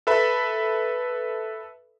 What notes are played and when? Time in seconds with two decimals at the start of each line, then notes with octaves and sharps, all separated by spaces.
0.07 A4 B4 E5 B5